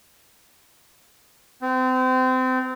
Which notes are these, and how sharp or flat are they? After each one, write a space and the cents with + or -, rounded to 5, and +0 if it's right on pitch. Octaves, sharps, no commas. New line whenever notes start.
C4 -30